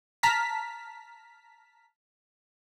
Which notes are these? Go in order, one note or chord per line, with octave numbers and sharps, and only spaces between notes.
A5 A#5 F6 B6